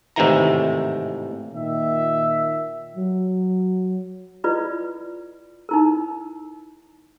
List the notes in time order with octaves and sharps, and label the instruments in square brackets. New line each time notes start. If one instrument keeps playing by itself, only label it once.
[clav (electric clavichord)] G#1 A2 C3 D#3 E3 A#5
[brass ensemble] A#2 D#3 E5
[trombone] F#3
[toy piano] E4 F4 B4 D5 D#5
D#4 E4 A#4